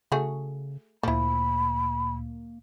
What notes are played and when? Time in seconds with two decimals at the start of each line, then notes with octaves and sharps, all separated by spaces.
0.12 C#3 A3 F#4 G#4
1.03 D2 A#2 F3 A#3 E4 B5